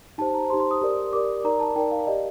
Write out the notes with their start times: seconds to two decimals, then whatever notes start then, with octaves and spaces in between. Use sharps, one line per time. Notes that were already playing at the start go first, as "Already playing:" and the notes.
0.18 D#4 G4 C5 A5
0.34 A#5
0.50 D#4 G4 C5 C6
0.60 C6
0.71 D#6
0.81 G4 A#4 D5
1.13 G4 A#4 D5 D6
1.44 D#4 A#4 D5 A#5
1.60 A5
1.76 D#4 A#4 D5 G5
1.91 F5
2.07 G4 D5 D#5